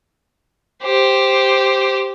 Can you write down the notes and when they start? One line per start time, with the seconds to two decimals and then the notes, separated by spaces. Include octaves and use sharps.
0.84 G4 C5